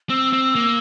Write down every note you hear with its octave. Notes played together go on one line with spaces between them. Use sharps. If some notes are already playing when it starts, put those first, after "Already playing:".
C4 E6
C4
A#3